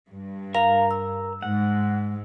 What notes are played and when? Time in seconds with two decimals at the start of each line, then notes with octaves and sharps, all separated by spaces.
0.11 G2
0.55 A#4 F5 A#5
0.91 E6
1.42 G#2 F#5